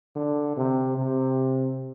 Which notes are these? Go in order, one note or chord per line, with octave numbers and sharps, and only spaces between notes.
D3
C3
C3